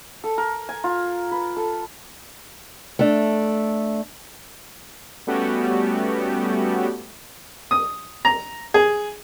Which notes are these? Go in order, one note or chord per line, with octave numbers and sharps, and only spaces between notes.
A4
A#4
G#5
F4
B4
A4
A3 D4
G3 A3 B3 C#4 F#4 G4
D#6
A#5
G#4